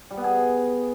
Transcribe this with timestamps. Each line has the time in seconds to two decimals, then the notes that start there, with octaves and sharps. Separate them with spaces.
0.11 G3
0.17 B3
0.24 G#4